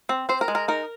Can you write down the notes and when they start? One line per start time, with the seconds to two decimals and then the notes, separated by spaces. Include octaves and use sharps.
0.09 C4
0.29 C4 C5
0.41 A#4
0.48 G#3
0.55 A#4
0.68 D#4 A#4